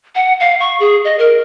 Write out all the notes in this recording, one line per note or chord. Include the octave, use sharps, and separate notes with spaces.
F#5
F5
C#6
G#4
D#5
A#4